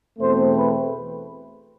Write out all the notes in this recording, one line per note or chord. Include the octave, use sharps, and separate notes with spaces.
E2 B2 A3 C4 C5
B4